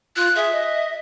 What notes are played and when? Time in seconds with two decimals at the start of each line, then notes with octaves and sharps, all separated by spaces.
0.16 F4 F#6
0.36 G#4 E5
0.52 D#5